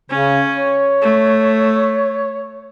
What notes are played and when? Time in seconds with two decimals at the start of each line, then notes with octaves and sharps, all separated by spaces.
0.10 C#3 C#4
0.54 C#5
1.02 A3